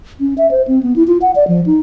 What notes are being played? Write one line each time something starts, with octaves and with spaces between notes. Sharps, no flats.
C#4
E5
C5
C4
B3
E4
F4
F#5
D5
F3
D#4